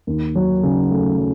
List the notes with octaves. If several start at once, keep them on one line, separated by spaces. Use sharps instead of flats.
D#2
F#3
C#3
A3
F#3